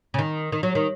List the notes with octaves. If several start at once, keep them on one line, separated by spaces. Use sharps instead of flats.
C#3
D#3
D#3
F#3
D#3